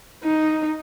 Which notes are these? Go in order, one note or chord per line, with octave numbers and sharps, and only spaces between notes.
D#4